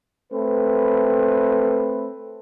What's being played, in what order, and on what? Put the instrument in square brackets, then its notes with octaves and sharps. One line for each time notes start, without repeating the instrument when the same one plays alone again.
[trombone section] A3 C4 B4